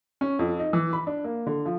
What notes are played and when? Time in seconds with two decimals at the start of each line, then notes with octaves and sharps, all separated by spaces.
0.21 C#4
0.39 F2
0.59 D#4
0.73 E3
0.93 B5
1.07 D4
1.24 A#3
1.47 D3
1.65 F3